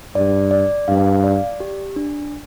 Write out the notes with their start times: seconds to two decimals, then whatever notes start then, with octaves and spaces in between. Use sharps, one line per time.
0.15 G2 D5
0.51 D5
0.88 G2 F5
1.24 D5
1.60 G4
1.96 D4